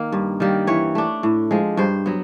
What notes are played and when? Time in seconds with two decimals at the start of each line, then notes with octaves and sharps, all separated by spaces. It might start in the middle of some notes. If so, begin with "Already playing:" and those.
Already playing: D#3 A#3
0.12 G2
0.40 D#3 G3 A#3
0.67 E3 C#5
0.95 A3 D4
1.23 A2
1.51 F3 G#3
1.77 G2 C5
2.06 F#3 B3